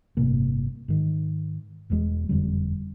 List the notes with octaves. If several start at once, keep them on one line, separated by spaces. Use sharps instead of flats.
G1 A2 C3 A#3
G#2 D#3
E1 E2 D#3 G#3
F#1 F2 D3 G3